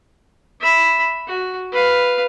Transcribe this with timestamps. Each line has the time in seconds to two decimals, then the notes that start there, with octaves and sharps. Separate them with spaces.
0.60 E5 B5
1.27 F#4
1.72 B4 F5